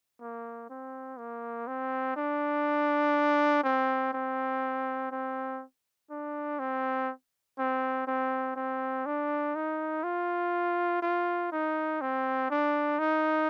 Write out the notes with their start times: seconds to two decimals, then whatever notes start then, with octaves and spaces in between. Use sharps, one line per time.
0.21 A#3
0.70 C4
1.18 A#3
1.68 C4
2.16 D4
3.64 C4
4.13 C4
5.11 C4
6.10 D4
6.59 C4
7.58 C4
8.07 C4
8.56 C4
9.06 D4
9.55 D#4
10.03 F4
11.02 F4
11.52 D#4
12.01 C4
12.50 D4
12.99 D#4